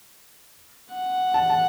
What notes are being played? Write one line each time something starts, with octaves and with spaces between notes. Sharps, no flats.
F#5
A5
A5